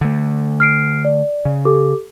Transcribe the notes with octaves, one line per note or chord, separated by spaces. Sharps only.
D3 A3
F6 C7 D7
D5
C#3
G4 A4 D6